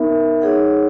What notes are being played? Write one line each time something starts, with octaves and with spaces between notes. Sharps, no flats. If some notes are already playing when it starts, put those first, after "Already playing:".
Already playing: B3 D#4 A#4 E5
D#4 G#4 C#5 F#5